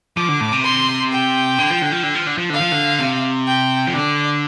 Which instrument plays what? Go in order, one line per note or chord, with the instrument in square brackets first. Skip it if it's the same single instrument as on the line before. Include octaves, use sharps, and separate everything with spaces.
[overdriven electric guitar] F3 [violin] D6
[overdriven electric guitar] D3
A2
C3
[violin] C6
G5
[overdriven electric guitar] D3
F3
D3
F3
D3
F3
D3
F3
[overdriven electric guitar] D3 [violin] F5
[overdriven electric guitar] F3
D3
C3
[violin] G5
[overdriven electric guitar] F3
[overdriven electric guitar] D3 [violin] D5